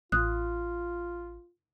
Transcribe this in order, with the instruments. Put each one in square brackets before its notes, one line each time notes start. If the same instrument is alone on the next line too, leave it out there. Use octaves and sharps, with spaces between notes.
[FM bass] A1 [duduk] F4 [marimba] D#6 F#6